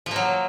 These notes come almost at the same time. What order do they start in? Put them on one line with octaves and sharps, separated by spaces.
F3 A#3 F#3